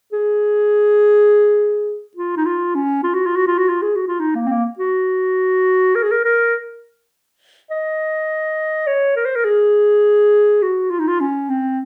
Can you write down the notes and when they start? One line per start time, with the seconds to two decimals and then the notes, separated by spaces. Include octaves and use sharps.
0.13 G#4
2.17 F4
2.36 D#4
2.46 F4
2.75 C#4
3.04 F4
3.14 F#4
3.26 F4
3.36 F#4
3.47 F4
3.58 F#4
3.69 F4
3.82 G#4
3.95 F#4
4.08 F4
4.20 D#4
4.35 A#3
4.46 C4
4.49 A#3
4.79 F#4
5.95 A#4
6.03 G#4
6.11 A#4
6.24 A#4
7.71 D#5
8.87 C#5
9.16 A#4
9.26 C5
9.36 A#4
9.44 G#4
10.62 F#4
10.90 F4
11.00 D#4
11.08 F4
11.20 C#4
11.49 C4